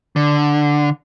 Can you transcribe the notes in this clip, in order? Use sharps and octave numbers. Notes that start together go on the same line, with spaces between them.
D3